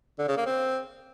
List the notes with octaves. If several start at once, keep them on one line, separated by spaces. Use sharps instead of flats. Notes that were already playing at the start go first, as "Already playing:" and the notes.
D3
C#3
A#3
C4